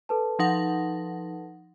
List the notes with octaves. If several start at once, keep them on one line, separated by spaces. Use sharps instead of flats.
A4 B4 A5
F3 D#4 F#5